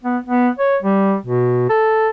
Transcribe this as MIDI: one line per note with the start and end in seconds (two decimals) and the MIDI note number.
0.04 0.18 59
0.27 0.49 59
0.59 0.77 73
0.83 1.15 55
1.26 1.68 47
1.69 2.09 69